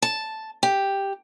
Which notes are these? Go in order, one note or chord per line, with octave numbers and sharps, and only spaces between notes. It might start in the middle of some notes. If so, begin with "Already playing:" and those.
A5
G4